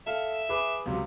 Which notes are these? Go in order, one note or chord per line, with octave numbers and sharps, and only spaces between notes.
A4 E5 F5
G#4 B4 D6
C#2 C3 F#3